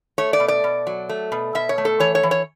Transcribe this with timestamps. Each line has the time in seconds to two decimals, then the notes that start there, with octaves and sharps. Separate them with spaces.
0.18 A3 C#5
0.33 D5
0.40 B2
0.48 D5
0.64 B2
0.87 F#3
1.09 A3
1.32 B2
1.55 B2 E5
1.69 C#5
1.78 A3
1.85 A4
2.00 E3 C#5
2.15 C#5
2.23 E3
2.31 C#5